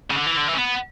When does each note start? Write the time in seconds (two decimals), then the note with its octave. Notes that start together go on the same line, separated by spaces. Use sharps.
0.11 C#3
0.16 D3
0.27 E3
0.37 D3
0.48 E3
0.54 C#4
0.58 B3